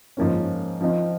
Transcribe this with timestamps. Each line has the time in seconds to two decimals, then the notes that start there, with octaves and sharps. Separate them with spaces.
0.17 G#2 F3 A#3 C#4
0.81 F3 C4 D#4